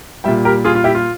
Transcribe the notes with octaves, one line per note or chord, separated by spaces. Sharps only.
A#2 G3 E5 G5
G4 A#4
F4 G#4
F4
E4 G4
F4